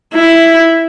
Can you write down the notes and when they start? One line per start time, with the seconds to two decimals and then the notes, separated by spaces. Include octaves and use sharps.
0.14 E4